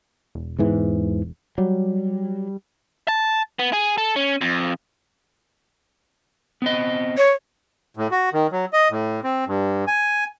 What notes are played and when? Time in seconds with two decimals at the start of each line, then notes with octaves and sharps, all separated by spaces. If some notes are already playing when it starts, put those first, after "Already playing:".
0.35 E1
0.59 E2 G#2 E3
1.58 F#3 G3
3.08 A5
3.59 B3
3.73 G#4
3.98 A4
4.16 C#4
4.41 F2
6.62 B3 C4 D#5
7.17 C#5
7.97 A2
8.11 F#4
8.33 D#3
8.52 F#3
8.73 D#5
8.90 A2
9.24 C4
9.47 G2
9.87 G#5